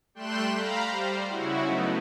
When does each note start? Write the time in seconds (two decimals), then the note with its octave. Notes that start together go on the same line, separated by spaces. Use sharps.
0.14 G3 A3 G5 C6 F#6 E7
0.52 F5 A#5 B5
0.89 G3 C5
1.27 C#3 E4 F#4
1.65 F#3 A3 B3 D#4